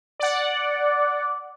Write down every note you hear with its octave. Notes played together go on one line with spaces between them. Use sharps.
D5 F#5